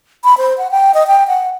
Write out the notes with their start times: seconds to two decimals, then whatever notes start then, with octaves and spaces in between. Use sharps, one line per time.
0.24 B5
0.38 C5
0.58 F#5
0.71 G5
0.94 D#5
1.07 G5
1.28 F#5